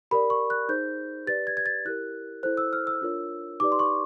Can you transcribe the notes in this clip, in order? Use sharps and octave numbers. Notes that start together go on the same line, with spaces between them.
G4 A#4 D5 B5
C#6
F#6
D#4 G#4 C5 G6
G4 B4 D5 A6
G#6
G#6
A6
E4 G4 A#4 F#6
E4 A4 C5 F#6
E6
F6
E6
D4 F4 A#4 C#5
D#4 G4 B4 D5 D6
C6
C#6